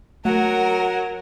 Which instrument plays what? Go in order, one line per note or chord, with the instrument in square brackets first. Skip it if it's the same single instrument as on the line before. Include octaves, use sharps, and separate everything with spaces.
[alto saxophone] F#3 [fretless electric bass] A3 [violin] A#4 [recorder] F#5